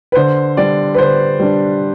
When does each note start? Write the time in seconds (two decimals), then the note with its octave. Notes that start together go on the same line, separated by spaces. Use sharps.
0.12 B4
0.15 D3 C5
0.57 G3 D4 D5
0.94 B4
0.98 D3 C5
1.39 G3 D4